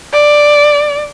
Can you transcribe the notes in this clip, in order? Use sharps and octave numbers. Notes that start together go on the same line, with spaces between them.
D5